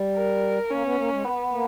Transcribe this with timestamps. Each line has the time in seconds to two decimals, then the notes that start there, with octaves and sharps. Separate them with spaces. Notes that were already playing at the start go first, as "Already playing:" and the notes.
Already playing: G3
0.16 A#4
0.71 A#3 C#4
0.84 B3
0.98 A#3
1.11 G#3
1.25 B3
1.51 A#3